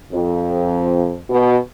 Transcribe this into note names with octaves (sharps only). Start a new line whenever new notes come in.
F2
B2